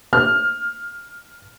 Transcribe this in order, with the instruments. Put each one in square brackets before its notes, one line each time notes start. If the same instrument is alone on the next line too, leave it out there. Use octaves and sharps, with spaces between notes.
[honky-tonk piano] F6